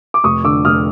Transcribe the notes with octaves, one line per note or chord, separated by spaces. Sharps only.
D6
F1 C#6 D#6
D3 D6 E6
F1 D#6 F6